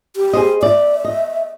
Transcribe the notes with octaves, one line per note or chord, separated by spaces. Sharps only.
G4
G#4 C5 D#5
D5 E5
D#5